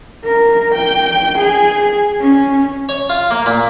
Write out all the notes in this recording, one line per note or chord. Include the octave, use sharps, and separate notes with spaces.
A#4
G5
G#4
C#4
C#5
F4
A#3
A#2